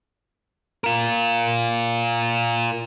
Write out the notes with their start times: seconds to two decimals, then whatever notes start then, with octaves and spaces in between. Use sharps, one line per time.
0.84 F4 A#4